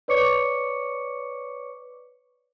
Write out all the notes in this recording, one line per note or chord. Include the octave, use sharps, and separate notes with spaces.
B4 C#5 D5 C#6 D6 C#7